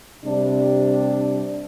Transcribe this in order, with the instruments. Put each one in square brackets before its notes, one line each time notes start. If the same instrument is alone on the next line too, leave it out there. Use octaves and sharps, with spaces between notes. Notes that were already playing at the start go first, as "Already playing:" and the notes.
[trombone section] C3 G3 D4